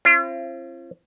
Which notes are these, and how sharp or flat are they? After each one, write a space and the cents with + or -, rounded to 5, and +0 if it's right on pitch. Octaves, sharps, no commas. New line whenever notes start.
C4 +35 F4 -45